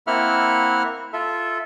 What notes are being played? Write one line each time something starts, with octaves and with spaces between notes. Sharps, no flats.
A#3 C4 E4 E5 F#5 F6
F4 A4 E5